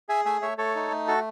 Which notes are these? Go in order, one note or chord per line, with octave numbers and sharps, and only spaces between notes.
G#4 E5 G#5
A3 E5 G#5
A3 C#5 E5
A3 A4 C#5
D#4
A3
F#4 A4